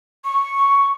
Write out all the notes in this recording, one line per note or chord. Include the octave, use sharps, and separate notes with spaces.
C#6